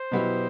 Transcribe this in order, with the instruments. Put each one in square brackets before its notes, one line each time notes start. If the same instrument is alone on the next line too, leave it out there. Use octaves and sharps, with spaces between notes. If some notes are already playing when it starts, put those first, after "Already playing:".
Already playing: [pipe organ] C5
[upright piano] B2 F#3 B3 E4 G4